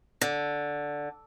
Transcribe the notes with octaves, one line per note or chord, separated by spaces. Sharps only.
D3